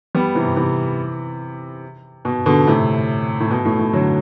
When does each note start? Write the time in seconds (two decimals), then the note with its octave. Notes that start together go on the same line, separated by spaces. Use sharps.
0.15 G3 B3
0.35 C3 E3
0.57 C3 E3
2.25 B2
2.46 B2 D3
2.67 A2 C3
3.40 A2
3.50 B2
3.65 A2
3.79 A2
3.93 D3 F#3